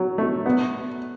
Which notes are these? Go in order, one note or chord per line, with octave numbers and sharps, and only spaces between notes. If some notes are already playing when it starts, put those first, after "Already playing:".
Already playing: F#3
A3
B3